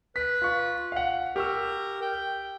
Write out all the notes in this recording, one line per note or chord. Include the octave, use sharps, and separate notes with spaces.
B4 B6
F4 C#6
F5 F#5
G4 A#4 C#6 E6
G5